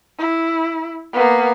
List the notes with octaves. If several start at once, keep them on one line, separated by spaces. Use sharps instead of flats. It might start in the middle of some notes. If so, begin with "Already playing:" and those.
E4
A#3 B3